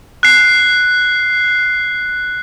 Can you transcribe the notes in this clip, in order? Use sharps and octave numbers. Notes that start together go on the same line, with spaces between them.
F#6 C7